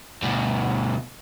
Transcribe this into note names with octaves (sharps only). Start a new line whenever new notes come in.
D2 B2